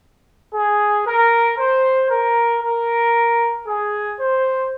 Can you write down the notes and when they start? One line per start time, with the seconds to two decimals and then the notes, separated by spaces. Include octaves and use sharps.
0.53 G#4
1.05 A#4
1.58 C5
2.09 A#4
2.62 A#4
3.66 G#4
4.18 C5